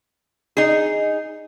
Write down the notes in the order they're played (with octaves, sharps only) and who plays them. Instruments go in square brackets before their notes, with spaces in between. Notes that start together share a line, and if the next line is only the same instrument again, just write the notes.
[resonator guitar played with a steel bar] D#4 G#4